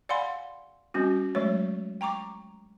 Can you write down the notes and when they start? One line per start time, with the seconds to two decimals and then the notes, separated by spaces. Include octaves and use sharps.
0.09 D5 F5 F#5 G#5 B5 C6
0.94 G3 C4 C#4 F#4
1.35 F#3 G#3 A3 C#5
2.01 G5 A#5 C#6 D6